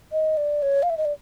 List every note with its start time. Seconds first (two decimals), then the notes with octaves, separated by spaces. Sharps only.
0.12 D#5
0.37 D5
0.62 C#5
0.83 F5
0.90 E5
0.97 D#5
1.05 D5